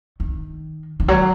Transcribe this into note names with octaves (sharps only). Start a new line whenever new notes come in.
D#3
D#3
F#3